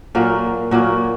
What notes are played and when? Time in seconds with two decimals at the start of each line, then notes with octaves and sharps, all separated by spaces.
0.15 A#2 F#3 A#3
0.71 A#2 F#3 A#3